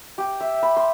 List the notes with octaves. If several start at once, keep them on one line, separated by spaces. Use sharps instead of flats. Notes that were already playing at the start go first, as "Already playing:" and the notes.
G4
E5
B5
C6